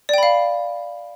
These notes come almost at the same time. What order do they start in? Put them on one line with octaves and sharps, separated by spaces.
D5 G5 B5 F5